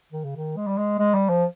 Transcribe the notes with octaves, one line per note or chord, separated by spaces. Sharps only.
D#3
C#3
D#3
G#3
G3
G#3
G#3
G3
F3